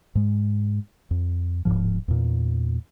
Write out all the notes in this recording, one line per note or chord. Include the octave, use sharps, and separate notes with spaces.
G#2 G#3
F2
D1 A#1 G#2 F3
E2 A#2